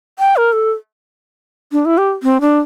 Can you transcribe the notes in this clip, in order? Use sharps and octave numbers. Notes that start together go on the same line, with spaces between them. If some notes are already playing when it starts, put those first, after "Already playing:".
G5
A#4
A4
D4
E4
G4
C4
D4